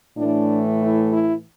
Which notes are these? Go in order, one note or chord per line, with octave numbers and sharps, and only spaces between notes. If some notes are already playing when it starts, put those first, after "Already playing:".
A2 E3 A3 D4
E4
E4